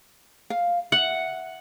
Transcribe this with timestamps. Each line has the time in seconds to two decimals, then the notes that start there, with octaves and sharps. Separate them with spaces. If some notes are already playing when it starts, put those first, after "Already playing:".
0.50 F5
0.92 E5 F#5